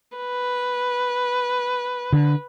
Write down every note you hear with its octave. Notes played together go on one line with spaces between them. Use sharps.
B4
D3